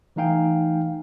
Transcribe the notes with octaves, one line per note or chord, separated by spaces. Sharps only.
E3 A3 D#4 F5 G5 G#5